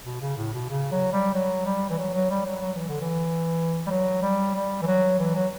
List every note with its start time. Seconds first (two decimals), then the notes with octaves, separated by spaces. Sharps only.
0.05 B2
0.21 C#3
0.37 A2
0.53 B2
0.69 C#3
0.91 F#3
1.12 G3
1.34 F#3
1.65 G3
1.90 E3
1.98 F#3
2.13 F#3
2.30 G3
2.45 F#3
2.62 F#3
2.75 E3
2.88 D3
3.01 E3
3.87 G3
3.90 F#3
4.22 G3
4.55 G3
4.82 E3
4.87 F#3
5.19 E3
5.35 F#3